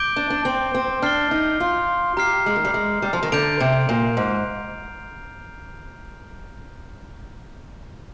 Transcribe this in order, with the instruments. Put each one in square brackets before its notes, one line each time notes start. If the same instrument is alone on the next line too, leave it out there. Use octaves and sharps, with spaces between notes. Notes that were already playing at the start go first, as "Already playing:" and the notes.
Already playing: [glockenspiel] D6 G6 D7 G7
[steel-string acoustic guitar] D4
D4
C4
C4
[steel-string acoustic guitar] D4 [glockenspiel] F6 C7 G7
[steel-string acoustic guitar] D#4
F4
[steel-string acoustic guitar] G4 [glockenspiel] A#5 F6 C7
[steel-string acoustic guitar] G#3
D#3
G3
G#3
G3
F3
D#3
[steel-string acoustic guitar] D3 [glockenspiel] G6 D7 F7
[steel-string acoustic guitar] C3
A#2
G#2